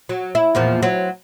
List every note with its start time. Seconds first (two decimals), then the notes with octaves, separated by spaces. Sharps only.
0.09 F#3
0.35 E4
0.55 E2 A#2 F3
0.83 F#3 C4